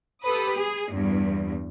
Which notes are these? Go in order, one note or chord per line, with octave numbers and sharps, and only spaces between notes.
G4 A4 B4 B5 D#6
G#4
E2 G2